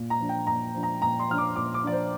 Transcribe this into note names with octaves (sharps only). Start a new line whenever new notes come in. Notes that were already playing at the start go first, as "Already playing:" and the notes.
Already playing: A#2
A#5
F3 D4
G5
A#2 A#5
F3 D4
A#5
A#2 A#5
C6
F3 D4 F6
D6
A#2 D6
D6
F3 D4 D5
C5